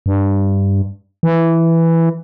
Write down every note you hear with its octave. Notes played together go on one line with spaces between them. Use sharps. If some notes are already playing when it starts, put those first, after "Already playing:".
G2
E3